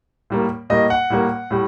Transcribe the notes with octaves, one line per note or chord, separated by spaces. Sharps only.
A2 G3 A#3
A2 G3 A#3 D#5
F#5
A2 G3 A#3
A2 G3